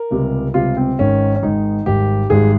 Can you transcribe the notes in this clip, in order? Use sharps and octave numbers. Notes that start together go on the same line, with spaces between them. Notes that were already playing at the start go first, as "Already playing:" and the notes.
Already playing: A#4
C#2 C3 G3
C#2 C3 G3 F4
C4
G#1 G#2 D#3 C#4
C#4
G#1 G#2 D#3 D#4
G#1 G#2 G3 G4
G#1 G#2 G3 G#4